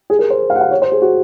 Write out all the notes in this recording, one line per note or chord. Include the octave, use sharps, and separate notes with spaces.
G#4
A#4
C5
F5
F#5
F5
C#5
C5
G#4
F#4